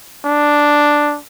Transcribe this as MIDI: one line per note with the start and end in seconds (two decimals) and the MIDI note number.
0.25 1.18 62